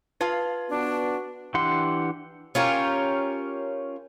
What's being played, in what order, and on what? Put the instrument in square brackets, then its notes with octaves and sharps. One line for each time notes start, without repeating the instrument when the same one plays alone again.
[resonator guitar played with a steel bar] F4 F5 [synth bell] B4 A5
[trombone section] B3 F#4 [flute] D4
[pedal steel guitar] E3 D4 G4 F#5 C6
[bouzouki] C#4 F4 G4 A#4